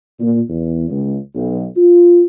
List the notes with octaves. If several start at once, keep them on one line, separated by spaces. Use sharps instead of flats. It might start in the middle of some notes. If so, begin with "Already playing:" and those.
A#2
E2
C#2
B1
F4